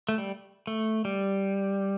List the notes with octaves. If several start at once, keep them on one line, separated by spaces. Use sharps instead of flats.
A3
G3
A3
G3